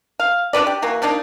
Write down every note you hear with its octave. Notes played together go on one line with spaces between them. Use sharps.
F5
D4 F#4 B4 D5
G4
E3 A#3 F#4
F3 A#3 D4 D#4